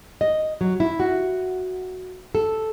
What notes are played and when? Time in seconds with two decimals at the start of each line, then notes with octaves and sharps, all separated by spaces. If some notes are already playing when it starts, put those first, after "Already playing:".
0.21 D#5
0.61 F#3
0.80 E4
1.00 F#4
2.35 A4